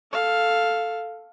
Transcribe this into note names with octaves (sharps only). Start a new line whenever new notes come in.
A4 F5